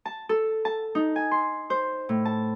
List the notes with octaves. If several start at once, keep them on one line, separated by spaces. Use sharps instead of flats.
A5
A4
A5
D#4
G#5
C6
C5
A2
A5